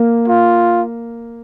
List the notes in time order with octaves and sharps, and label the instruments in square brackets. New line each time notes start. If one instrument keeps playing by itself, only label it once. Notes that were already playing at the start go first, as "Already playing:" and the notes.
Already playing: [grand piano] A#3
[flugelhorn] F4